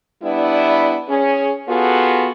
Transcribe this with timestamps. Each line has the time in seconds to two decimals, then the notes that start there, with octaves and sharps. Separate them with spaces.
0.23 G3 B3 D4 E4
1.09 C#4 G#4
1.69 B3 F4 F#4 G#4 A4